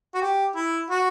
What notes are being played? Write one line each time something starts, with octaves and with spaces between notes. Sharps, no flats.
F#4
G4
E4
F#4